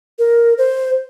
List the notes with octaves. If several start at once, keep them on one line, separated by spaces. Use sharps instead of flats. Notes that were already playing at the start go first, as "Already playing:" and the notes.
A#4
C5